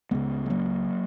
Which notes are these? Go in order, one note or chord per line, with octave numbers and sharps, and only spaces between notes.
C#2 C#3 G#3 B3
G#3
F#3 A#3